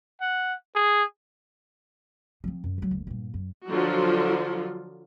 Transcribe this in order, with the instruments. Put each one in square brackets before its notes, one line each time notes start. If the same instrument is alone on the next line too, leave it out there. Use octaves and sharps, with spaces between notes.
[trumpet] F#5
G#4
[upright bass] F3 C4
F#2
F3 F#3
F#1 D2
G2 A#2
F#2
[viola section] D3 F3 F#3 F4 F#4